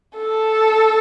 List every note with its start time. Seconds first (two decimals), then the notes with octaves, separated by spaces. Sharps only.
0.16 A4